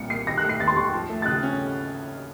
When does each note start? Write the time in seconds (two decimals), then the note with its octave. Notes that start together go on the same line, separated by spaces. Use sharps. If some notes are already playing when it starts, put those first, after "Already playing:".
Already playing: C2 A#2 F3 C#7
0.10 A#3 C7
0.26 D#3 A#6
0.38 F#6
0.43 A3
0.49 C7
0.60 D#2 A6
0.68 C6
0.76 D#2 C#6
0.85 C6
0.93 F3
1.09 A3
1.22 A6
1.26 C#3 F#6
1.43 C#4